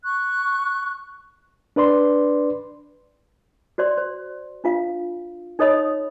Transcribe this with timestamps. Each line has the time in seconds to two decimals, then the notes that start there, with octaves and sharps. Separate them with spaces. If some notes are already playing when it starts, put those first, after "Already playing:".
0.04 C#6 F#6
1.76 D4 B4 D5 C6
3.78 F#4 C5 D5 C6
3.97 C5
4.64 D4 F4 F5
5.59 D#4 A4 C#5 D#5 B5 D#6